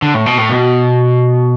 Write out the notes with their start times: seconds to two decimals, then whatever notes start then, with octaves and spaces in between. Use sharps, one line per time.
0.02 D3
0.14 A2
0.26 B2
0.38 A2
0.49 B2